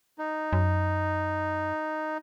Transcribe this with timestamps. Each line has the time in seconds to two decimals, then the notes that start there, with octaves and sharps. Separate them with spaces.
0.18 D#4
0.53 F#2